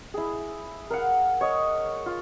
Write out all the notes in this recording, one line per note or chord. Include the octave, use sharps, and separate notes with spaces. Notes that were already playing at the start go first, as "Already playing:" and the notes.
E4 G#4
A#4 F5 F#5
C#5 D#5
F4